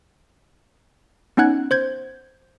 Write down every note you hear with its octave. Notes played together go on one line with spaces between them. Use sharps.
B3 C#4 D#4 F#5 F#6 G#6
C5 G6 G#6